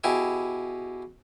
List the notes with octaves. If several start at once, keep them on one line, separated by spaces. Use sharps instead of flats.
B2 E4 G4 G#4 D6